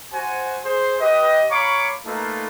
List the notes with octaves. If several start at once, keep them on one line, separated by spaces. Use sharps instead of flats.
F#4 C5 G#5
G#4 C5
G4 B4 D#5
C#5 F5 A#5 B5 C#6 D6
A3 A#3 D#4 F4 A4 B4